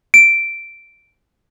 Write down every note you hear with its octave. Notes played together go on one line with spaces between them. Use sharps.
D7